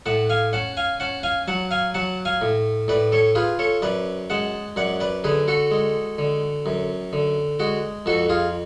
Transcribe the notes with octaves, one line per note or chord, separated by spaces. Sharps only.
A2 F#5 A5
F5 G#5
C#4 F#5 A5
F5 G#5
C#4 F#5 A5
F5 G#5
F#3 F#5 A5
F5 G#5
F#3 F#5 A5
F5 G#5
A2
A2 B4 D5
A4 C#5
F4 G#4 B4
A4 C#5
F#2 B4 D5
G#3 F#5 A5
F#2 D5 F#5
B4 D5
D3 G#4 B4
F#4 A4
G#3
D3
F#2
D3
G#3 F#4
F2 F#4 A4
F4 G#4